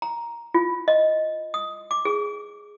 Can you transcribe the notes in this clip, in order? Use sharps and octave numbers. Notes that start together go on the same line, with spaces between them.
A#5
F4
D#5
D#6
D6
G#4